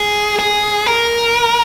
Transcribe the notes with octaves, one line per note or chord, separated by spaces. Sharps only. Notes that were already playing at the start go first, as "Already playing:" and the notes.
Already playing: G#4
G#4
A#4